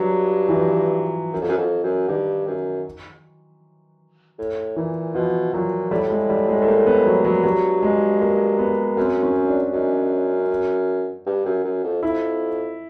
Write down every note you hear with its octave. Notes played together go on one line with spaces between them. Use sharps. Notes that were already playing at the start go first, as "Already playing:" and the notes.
Already playing: G2 F#3
E3
F3
F#2
F2
F#2
F2
F#2
G2 D#3
F#2
A2
A#2 E3
B2 F3
A#2 F#3
A2 G3
G#3
G3
G#3
A3
A#3
B3
F#3
F#3
G2 F#3
G#3
A#3
B3
F#2 C4
C#4
D4
F#2 D#4
G2
F#2
F#2
F2
F2 E4